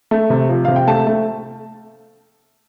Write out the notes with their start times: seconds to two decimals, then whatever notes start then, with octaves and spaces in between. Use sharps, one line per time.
0.11 A3
0.30 C3
0.49 F3
0.65 C3 F5
0.76 G5
0.88 A3 A5
1.07 A3